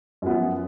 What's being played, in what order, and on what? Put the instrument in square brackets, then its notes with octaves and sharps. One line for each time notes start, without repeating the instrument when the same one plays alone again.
[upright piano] F#2 F3 B3